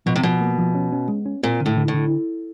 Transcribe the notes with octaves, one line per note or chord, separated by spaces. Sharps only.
B2 F3
C3
B2 F3
A#3
F3
C#4
C#4
G#3
C#4
A#2 C4
D3
A2
D3
A2
D3